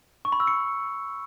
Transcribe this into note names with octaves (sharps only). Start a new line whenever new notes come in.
C#6
B5
E6
C#7